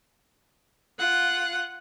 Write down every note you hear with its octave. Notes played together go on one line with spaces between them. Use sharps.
F4 F#5